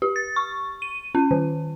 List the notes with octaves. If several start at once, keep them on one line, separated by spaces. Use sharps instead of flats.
G4
A6
C#6
D#7
C#4
D#3